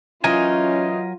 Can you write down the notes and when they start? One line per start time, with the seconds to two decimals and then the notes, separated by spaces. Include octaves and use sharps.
0.24 E3 F#3 C#4 D#4 F4 A#4 G#5